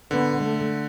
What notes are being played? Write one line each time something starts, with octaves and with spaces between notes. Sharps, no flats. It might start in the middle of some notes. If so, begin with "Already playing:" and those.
D3 B3
A3